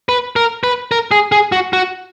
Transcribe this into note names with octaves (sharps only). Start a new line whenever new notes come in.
B4
A#4
B4
A#4
G#4
G#4
F#4
F#4